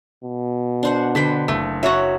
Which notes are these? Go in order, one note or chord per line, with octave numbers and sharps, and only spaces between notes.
B2
D4 C5 F#5
D3 B4 C5 G5 B6
F#1 A3
F#3 F#4 C#5 E5